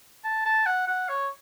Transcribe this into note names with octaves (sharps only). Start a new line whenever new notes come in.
A5
A5
F#5
F#5
C#5